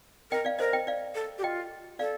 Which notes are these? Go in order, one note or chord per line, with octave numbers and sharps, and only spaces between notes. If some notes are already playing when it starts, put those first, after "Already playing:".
A#4 D#5 G5
D5 F5
A#4 C5 D#5
D#5 G5
D5 F5
A4
G4
F4 D#5 G5
A4 D5 F5